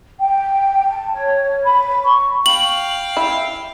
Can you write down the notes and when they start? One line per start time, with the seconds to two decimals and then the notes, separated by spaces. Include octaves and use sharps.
0.20 G5
0.88 A5
1.13 C#5
1.64 B5
2.04 C#6
2.46 F5 G5 F#7
3.17 E4